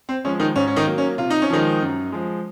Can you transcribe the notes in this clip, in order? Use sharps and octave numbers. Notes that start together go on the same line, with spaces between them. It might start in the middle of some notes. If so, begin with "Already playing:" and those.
C4
F3 G#3 C#4
D#3 D#4
G#2 C#4
C#4
D#3 D#4
F#3 A#3
C#4
C3 F4
D#4
C#4
D#3 F3 G#3 D#4
F#2
F3 G#3